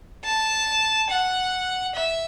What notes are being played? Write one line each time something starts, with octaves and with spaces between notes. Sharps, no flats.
A5
F#5
E5